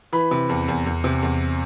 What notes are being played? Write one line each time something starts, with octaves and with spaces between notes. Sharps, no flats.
E3 B5
C3
E2
E2
E2
C3
E2